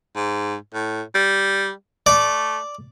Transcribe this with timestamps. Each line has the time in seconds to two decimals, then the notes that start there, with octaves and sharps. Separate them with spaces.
0.16 G#2
0.74 A2
1.15 G3
2.06 A3 D5